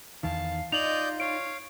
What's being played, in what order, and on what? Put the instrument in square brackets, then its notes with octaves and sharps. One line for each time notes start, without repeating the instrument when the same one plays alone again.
[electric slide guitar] E2 D#3 [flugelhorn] F5 [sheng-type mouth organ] A5
[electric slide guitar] D#4 [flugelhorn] F4 [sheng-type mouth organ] D5 D#5 G6 [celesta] F7 F#7
[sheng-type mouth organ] C#5 F5 [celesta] D7